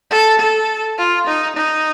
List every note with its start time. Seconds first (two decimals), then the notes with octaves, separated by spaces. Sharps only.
0.11 A4
0.39 A4
0.98 F4
1.27 D#4
1.56 D#4